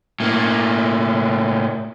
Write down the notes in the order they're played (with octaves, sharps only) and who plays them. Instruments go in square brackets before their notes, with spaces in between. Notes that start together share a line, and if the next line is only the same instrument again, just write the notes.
[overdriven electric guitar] A2 A#3